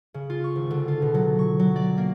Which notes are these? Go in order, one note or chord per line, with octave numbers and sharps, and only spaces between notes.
C#3
F4
C#6
G#1
D3
F4
B2
F#3
C#6
F#3
D5
A#3